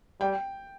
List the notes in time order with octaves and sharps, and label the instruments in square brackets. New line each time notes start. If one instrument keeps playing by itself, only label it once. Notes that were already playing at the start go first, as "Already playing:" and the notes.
[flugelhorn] G3 [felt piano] G5